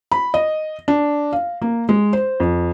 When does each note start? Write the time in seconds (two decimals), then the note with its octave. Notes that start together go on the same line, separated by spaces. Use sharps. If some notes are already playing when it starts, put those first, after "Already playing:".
0.12 B5
0.34 D#5
0.88 D4
1.33 F5
1.62 A#3
1.89 G#3
2.13 C5
2.40 F2